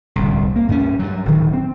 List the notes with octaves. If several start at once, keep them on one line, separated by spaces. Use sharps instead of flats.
D1 C2
A#3
G2 C#4
G2 F#3
D1 D#3
C4